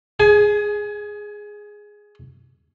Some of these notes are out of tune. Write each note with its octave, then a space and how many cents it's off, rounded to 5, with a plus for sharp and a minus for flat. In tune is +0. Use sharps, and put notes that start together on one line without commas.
G#4 +0 G#5 +30